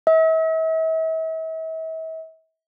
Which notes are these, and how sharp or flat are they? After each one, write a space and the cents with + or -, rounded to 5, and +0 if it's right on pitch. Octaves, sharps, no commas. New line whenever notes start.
E5 -40